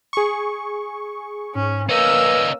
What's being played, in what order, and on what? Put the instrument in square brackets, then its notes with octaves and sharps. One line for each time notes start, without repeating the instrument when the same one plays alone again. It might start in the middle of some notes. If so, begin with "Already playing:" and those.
[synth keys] G#4 C#6
[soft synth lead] G#2 [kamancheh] C#4
[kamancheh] A#3 E6 [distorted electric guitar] C#4 D#4 [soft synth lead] B4